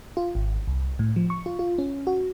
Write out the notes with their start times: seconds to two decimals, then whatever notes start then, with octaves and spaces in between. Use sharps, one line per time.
0.17 F4
0.35 G#1
0.67 C2
0.99 A2
1.16 F3
1.30 C#6
1.46 F4
1.59 F4
1.78 C#4
2.07 F#4